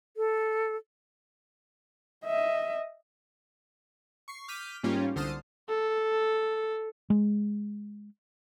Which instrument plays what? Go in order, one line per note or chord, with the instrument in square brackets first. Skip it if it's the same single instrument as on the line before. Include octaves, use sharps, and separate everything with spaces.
[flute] A4
[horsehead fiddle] D#5 E5
[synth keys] C#6 C7
D6 F6 G6 B6 D#7
G#2 G3 A#3 C#4 F4 G4
C2 D3 C5 A5 D#6 F6
[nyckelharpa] A4
[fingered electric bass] G#3